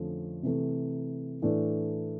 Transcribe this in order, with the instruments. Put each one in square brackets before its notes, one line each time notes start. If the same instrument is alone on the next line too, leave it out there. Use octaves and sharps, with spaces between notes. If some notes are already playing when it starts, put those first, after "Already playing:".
Already playing: [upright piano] F2 D3 F3 A3 C#4
C3 E3 A3
A2 E3 A3 D4